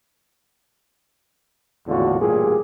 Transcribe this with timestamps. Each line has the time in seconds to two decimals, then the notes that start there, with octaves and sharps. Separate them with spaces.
1.87 G#1 E2 A2 D3 F4 F#4
2.20 A1 G2 A#2 G3 G#4